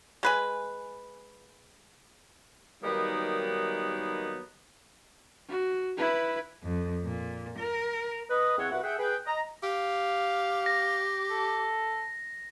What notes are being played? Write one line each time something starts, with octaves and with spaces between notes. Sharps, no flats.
G#3 B4 G#5
D#3 F#3 G3 A#3 B3 D#4
F#4
E4 B4
F2
A#2
A#4
B4 D#5
E2 C4 C#5 F#5
C2 E4 F#4 B4 F#5
G#4 E5 F#5 G5
G#4 B4 G5
D#5 A#5
G4 F5
A#6
A4